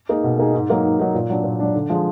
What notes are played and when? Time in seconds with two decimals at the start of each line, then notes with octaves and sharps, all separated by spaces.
0.09 A#3 D#4 G#4
0.24 B2
0.39 A#3 D#4 G#4
0.54 G#2
0.69 F#3 A#3 D#4
0.84 G#2
0.99 F#3 A#3 D#4
1.14 A#2
1.30 F#3 D4
1.44 A#2
1.59 F#3 D4
1.75 D3
1.90 F3 G#3